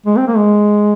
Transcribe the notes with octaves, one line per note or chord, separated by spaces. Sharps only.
G#3
C4
A#3
G#3